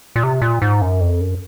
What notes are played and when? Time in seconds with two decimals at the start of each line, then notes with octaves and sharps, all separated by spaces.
0.16 A#2
0.23 C3
0.42 A#2
0.62 G#2
0.82 F#2
1.01 F2
1.20 F#2